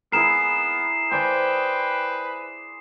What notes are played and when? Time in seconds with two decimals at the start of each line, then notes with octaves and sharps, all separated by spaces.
0.12 B3 E4 G#4 A#4 C7 E7
1.12 B4 C5 D5 G5 G#5